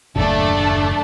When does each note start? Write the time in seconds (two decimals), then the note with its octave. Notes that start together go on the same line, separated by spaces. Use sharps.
0.16 F#1 D#2 A2 A3 D4 A4